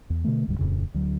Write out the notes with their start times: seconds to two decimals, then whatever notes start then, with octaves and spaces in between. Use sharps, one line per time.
0.10 E2
0.24 B2 D3 E3 A3
0.47 D1 D2 G#2 G3
0.59 D#1 F2 A2 C#3
0.94 D2 F#3